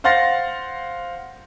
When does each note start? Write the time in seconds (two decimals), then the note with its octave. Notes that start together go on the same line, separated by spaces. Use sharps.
0.04 C5 F5 F#5 C6 A6 A#6